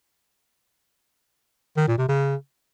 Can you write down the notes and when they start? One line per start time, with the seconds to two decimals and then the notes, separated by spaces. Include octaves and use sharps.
1.77 D#3
1.87 A#2
1.98 C3
2.08 C#3